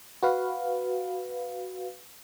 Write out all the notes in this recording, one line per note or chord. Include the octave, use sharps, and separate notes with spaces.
F#4 B4 F5